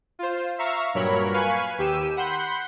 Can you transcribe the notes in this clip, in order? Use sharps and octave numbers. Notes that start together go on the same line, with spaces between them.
F4 C5
E5 F5 A#5 C#6 E6
G2 A#2 F#3 A#4 C#5 B5
B4 F5 G#5 B5 C#6
D#2 G4 E6 D#7 E7
F#5 B5 C6 G6